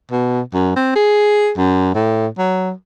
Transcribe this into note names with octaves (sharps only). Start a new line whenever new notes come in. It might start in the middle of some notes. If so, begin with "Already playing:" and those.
B2
F#2
C4
G#4
F#2
A2
F#3